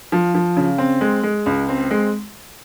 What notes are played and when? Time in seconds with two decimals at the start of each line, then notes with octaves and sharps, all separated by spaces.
0.12 F3
0.34 F3
0.57 C#3
0.78 C4
1.01 G#3
1.23 G#3
1.46 C#2
1.68 C4
1.91 G#3